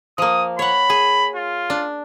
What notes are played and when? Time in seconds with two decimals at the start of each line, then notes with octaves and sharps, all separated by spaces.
0.18 F3 A#3 D#6
0.59 C#5 F#5 B5
0.90 G#4
1.35 F4
1.70 D4